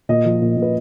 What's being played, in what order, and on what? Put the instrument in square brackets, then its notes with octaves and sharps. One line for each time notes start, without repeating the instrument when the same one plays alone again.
[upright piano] A#2 D#5
F3
A#2
A#2
B4